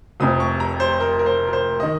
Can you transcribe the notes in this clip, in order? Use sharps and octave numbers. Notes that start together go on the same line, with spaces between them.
F1 F2 C3 D#6
C#6
A#5
C5
C5
A#4
A#4
C5
A#4
C5
D#3 D#5